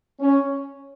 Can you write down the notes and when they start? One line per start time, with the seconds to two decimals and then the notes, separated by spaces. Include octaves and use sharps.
0.20 C#4